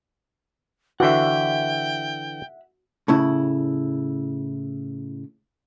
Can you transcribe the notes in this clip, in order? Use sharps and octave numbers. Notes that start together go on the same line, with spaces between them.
D3 E3 F#4 E5 F#5 G5
A2 C#3 E4